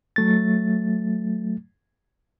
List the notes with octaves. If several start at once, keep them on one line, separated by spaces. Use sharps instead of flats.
F#3 A3 A6